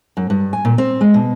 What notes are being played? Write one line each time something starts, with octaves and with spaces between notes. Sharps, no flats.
F#2
G2
G#5
A#2
C4
G#3
B2